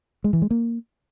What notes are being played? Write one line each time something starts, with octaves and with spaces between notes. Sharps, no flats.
G#3
E3
G#3
A#3